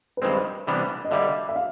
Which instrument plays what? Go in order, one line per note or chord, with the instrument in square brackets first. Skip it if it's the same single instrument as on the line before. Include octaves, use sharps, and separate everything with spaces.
[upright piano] B4
[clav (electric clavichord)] G2 D#3 G#3 C4 [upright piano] C5
[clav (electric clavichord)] C3 E3 G3 B3 D4
[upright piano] D#5
[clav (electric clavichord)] D3 G3 A#3 [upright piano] E5
[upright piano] E5
F5